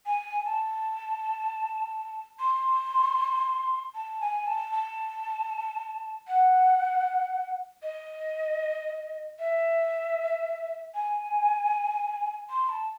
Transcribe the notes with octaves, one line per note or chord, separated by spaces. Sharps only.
G#5
A5
C6
A5
G#5
A5
A5
F#5
D#5
E5
G#5
C6
A5